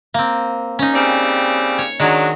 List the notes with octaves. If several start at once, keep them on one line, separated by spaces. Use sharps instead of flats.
A#3 C4
C#4 D#4
C#3 G3 C4
C#5
D#3 F#3 G#3 D4 A#5